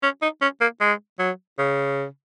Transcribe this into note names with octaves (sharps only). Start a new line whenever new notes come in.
C#4
D#4
C#4
A#3
G#3
F#3
C#3